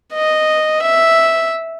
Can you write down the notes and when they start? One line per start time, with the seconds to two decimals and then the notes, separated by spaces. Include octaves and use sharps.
0.13 D#5
0.83 E5